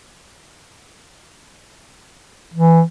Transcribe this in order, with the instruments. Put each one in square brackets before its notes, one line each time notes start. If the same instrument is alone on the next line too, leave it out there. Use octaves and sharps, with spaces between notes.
[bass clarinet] E3